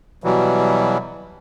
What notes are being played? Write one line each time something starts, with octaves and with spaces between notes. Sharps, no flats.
B2 E3 F#3 G3